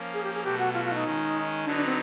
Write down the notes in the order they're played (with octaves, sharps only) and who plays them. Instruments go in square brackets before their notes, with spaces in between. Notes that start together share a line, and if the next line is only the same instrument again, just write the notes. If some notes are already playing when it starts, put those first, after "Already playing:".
Already playing: [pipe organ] F3 A#3 C#4
[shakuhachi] G#4
G4
G#4
[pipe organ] B2 F#3 A3 [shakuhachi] G4
[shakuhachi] F#4
F4
F4
D#4
[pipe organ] D#3 G#3 C#4
[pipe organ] D3 F#3 B3 D#4 [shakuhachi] D4
[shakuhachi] D4
C4